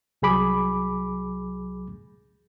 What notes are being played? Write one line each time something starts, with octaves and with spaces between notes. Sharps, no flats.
C2 F#3 G#4 B5 D6